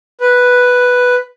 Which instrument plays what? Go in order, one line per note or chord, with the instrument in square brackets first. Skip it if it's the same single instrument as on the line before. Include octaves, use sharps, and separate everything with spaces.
[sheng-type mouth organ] B4